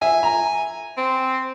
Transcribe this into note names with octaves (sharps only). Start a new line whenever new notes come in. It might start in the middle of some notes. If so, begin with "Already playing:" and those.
E5 G#5
A#5
C4